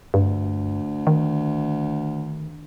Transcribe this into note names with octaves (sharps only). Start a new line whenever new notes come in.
D2 G2
D#3